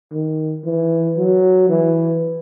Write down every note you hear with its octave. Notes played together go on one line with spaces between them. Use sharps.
D#3
E3
F#3
E3